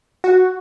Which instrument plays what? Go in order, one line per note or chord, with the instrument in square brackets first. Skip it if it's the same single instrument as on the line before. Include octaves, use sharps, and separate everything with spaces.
[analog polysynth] F#4